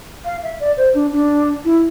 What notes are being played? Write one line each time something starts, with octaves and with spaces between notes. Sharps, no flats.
F5
E5
D5
C5
D4
D4
E4